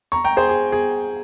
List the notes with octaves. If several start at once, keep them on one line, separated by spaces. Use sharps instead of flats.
A#5 C#6
G5 A#5
G#4 C5
G#4
G#4